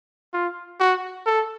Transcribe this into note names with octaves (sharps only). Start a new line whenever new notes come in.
F4
F#4
A4